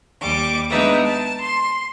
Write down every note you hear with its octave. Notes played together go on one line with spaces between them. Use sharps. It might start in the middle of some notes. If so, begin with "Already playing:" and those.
D#2 G3 D6
G#3 B3 D4 D#4 B4 E5
A5
C6